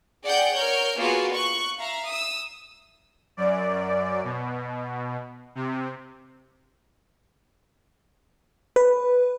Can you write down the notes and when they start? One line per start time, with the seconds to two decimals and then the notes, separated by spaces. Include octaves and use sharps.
0.25 G#4 D5 F#5 G5 G6
0.56 A#4 C#5 F6 G6
0.97 A#3 B3 F4 F#4 G#4
1.36 C#6 F#6
1.79 E5 F5 A#5
2.09 D#6 E6
3.37 F#2 D5
4.24 B2
5.55 C3
8.76 B4